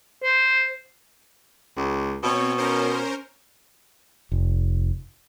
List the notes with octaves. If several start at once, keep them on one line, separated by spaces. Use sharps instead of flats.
C5
C#2
B2 C4 C#5
C#4 A#4 C5
F1